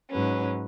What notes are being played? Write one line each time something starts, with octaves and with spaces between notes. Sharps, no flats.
G#2 F#3 C#4 B4